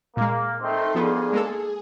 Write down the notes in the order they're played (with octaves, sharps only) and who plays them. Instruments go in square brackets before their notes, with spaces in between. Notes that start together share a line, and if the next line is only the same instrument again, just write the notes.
[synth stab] A#2 G#3 [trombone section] A#3
[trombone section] D#3 A3 C4 [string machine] D#4 A4 C6
[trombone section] G2 A#2 [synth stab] F3 B3 [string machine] G#4
[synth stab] G#3 A#3 A4